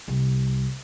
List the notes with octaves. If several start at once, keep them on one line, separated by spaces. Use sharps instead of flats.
C2 G3